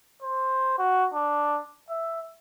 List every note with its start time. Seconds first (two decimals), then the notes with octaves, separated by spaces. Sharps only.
0.22 C5
0.78 F#4
1.13 D4
1.90 E5